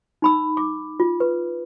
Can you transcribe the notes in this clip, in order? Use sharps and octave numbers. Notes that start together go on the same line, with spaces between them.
D#4 B5 E6
D6
F4
B4